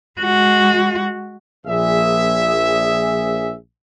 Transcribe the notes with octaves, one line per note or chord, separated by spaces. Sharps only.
G#3 F#4
A#1 G#4 E5